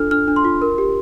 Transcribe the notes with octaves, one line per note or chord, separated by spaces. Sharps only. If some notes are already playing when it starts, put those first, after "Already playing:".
Already playing: D4 F4 A4 F6
D4 F6
D4
C6
F4
A#4
G4